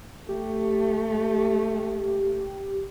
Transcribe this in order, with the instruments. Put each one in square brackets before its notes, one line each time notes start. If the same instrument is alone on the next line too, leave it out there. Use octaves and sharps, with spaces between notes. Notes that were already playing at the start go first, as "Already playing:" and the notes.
[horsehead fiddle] A3 [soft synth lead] G4